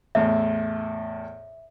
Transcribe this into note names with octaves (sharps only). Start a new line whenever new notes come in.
E2 A2 E5